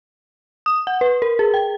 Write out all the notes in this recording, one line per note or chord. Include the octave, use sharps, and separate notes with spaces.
D#6
F#5
B4
A#4
G#4
G5